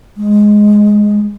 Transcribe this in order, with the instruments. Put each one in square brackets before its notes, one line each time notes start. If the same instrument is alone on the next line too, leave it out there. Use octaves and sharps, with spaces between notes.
[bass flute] G#3